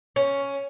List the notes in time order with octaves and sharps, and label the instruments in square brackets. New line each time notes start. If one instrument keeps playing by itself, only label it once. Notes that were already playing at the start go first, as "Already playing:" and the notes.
[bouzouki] C#4